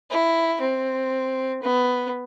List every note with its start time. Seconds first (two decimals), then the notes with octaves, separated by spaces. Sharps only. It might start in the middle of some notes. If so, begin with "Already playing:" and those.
0.10 E4
0.61 C4
1.63 B3